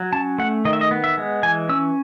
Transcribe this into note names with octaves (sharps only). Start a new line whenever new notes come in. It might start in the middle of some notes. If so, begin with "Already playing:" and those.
Already playing: F#3
C#4 A5
A3 F#5
D#3 D#5
E5
D#5
B3
E5
G#3
E3 G#5
C#4 E6